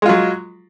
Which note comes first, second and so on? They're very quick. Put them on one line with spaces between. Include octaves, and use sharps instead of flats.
G#3 F4 F#3